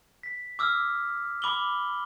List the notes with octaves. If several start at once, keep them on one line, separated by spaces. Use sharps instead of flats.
B6
D6 E6 F6
B5 D6 F#7 G7